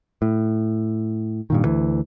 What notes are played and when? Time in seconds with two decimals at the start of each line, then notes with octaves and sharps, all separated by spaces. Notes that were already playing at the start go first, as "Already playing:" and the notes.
0.22 A2
1.50 G2 A#2 D#3
1.64 D2 E3